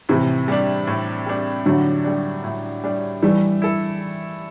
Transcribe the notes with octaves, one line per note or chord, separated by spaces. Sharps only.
A2 C3 E3
G3 D4
A2
G3 D4
A2 D3 F#3
G3 D4
A2
G3 D4
E3 G3 A3
E4 A4